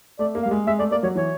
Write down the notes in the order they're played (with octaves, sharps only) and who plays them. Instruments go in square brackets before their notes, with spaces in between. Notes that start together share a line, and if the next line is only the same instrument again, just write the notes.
[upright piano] A3 [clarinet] D5
[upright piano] A#3
[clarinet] F5
[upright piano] G3
G#3
[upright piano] G#3 [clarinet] E5
[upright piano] A3 [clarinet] D5
[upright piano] A#3 [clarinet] D5
[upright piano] F#3 [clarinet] C#5
[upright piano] E3 [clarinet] C#5